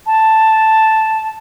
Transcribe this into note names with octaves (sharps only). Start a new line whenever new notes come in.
A5